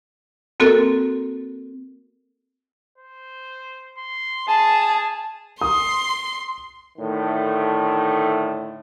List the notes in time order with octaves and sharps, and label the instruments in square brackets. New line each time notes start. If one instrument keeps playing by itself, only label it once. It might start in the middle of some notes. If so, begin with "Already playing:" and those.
[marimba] A#3 C4 F#4 A4 A#4
[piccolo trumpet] C5
C6
[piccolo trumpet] G#4 [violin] A5
[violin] C6 [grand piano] D#6
[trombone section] A2 D3 D#3 A3